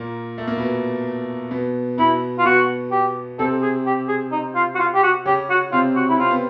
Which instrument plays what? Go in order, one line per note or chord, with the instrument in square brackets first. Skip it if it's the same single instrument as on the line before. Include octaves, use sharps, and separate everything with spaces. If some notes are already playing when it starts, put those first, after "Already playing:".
Already playing: [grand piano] A#2 A#3
A3
A#3
B2 B3
B2 B3
[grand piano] B2 B3 [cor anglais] E4
[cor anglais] F4
[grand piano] B2 B3 [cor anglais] F#4
[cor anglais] G4
[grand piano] C3 C4 [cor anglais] A4
[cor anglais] G#4
G4
G#4
D#4
F4
F#4
F4
G4
F#4
[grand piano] C#3 C#4 [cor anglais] G4
[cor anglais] F#4
[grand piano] C3 C4 [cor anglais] F4
[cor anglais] F#4
E4
[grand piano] C4 [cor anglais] F4
[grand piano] B3